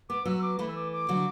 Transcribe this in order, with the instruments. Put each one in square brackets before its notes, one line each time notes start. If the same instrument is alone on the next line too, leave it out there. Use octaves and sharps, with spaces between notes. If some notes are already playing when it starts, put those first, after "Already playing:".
[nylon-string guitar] B3 [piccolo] D6
[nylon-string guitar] F#3 B3 [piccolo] E6
[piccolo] D6
[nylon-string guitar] E3 A3 [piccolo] B5
[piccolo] E6
D6
D6
[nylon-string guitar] D3 F#3